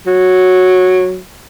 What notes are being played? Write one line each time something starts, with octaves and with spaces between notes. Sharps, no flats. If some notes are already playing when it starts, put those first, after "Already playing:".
F#3